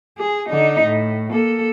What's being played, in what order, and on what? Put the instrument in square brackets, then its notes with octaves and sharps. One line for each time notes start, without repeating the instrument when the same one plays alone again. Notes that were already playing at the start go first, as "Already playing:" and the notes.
[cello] G#4
D3 D#4
A2
A#3 A4